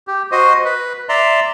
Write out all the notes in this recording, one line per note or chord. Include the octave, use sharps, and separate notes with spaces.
G4
F#4 C5 D#5
B4
D5 E5 A#5 C6